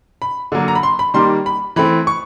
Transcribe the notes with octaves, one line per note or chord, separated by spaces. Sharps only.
B5
D3 F#3 A#3
A#5
B5
C6
B5
D#3 G3 A#3 C6
B5
E3 A3 C4 B5
C#6